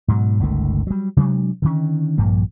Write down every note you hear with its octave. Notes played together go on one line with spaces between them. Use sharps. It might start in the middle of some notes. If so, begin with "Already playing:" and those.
G#2 B2 D#3 F#3
G1 C#2 D#3 A3
F#3 G3
C3 F#3 G#3 D4
D3 D#3 C#4
A#1 G2 F3 A#3